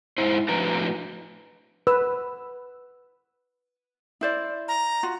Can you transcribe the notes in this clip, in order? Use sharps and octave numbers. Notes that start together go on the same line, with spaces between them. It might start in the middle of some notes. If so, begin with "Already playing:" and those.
G#2 E4 C5
A2 F3 D4 F#4 B4 A#5
B4 E6
E4 C5 D5
A#5
F4 F#4